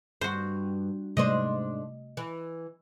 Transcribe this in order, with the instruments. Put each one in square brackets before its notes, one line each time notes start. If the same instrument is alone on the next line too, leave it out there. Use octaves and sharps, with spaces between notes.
[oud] G2 [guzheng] F#4 C5
[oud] G#2 D4 C5 [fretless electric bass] C3 G3 A3 [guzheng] D#5
[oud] E3